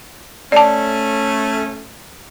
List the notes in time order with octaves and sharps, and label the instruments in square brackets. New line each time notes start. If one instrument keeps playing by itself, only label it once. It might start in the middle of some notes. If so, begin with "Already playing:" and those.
[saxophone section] A3 C#4 [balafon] D5 A5